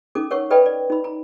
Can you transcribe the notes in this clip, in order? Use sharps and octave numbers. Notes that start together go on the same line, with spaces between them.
C#4 D#4 A4 D6
A#4 C#5 F#5 C#6
A4 B4 D5 D#5 G5 B5
D5
D#4 B5
A#5